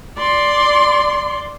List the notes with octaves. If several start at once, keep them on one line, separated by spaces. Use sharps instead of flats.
D5 C6